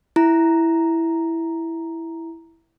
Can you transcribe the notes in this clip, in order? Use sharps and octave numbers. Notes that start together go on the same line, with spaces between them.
E4 A#5